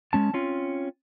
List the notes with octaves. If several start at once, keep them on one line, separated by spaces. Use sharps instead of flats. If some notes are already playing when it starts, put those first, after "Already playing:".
G#3 C#4 A5
C4 C#4 F4